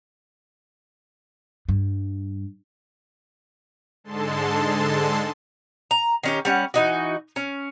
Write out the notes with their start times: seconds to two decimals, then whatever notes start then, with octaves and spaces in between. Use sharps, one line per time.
1.69 G2
4.04 G#2 D3 G#3 A4 A5 C6
5.91 A#5
6.23 D#3 C#4 G4
6.45 G3 C#4 F#5
6.74 E3 D#4 F#4
7.36 C#4